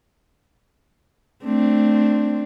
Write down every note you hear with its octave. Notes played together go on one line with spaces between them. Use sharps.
A3 C4 D4